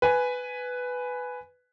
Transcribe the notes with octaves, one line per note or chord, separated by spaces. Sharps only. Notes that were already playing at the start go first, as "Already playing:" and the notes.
B4 G#5